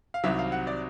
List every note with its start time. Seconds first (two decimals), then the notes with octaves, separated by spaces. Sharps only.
0.14 F5
0.24 C2 C3 D#3 F#3 E5
0.38 F5
0.52 F#5
0.67 D5